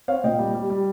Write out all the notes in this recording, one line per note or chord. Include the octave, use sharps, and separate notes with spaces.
C4 C#5 F5
A#2 D#5 G5
G3
G3
G3